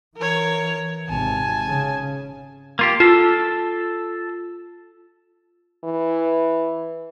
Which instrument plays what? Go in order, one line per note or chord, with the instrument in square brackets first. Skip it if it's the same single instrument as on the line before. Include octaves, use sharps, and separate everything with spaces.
[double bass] E3 [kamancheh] A#4 C#5
[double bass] G#1 C3 [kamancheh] G#5 A5
[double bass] C#3
[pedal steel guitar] A#3 F4 G4
[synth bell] F4 [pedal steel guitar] A4 A5
[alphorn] E3